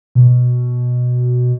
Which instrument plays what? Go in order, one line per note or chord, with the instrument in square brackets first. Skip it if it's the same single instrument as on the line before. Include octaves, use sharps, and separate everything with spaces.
[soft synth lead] B2